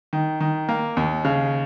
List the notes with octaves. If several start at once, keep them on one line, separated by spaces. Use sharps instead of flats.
D#3
D#3
A#3
D#2
C#3